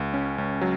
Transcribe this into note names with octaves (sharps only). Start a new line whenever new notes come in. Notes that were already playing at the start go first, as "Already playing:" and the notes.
Already playing: C#2
C#4
C#2
F#3